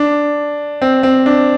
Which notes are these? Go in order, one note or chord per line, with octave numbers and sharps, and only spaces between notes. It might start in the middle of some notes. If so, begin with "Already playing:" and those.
Already playing: D4
C4
C4
D4